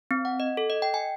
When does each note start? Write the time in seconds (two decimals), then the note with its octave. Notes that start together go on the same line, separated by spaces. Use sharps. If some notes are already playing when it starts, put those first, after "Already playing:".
0.11 C4
0.25 F#5
0.40 D#5
0.57 A4
0.70 D#5
0.82 G5
0.94 G#5